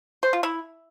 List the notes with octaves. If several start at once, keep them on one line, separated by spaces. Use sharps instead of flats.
C5
F4
E4